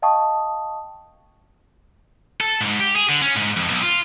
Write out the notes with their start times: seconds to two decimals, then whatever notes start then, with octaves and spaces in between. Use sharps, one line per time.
0.02 D#5 F5 G5 A5 C#6 D#6
2.41 A4
2.61 G#2
2.80 G4
2.96 G#4
3.09 D3
3.22 C#4
3.36 G#2
3.56 F2
3.69 B1
3.82 F4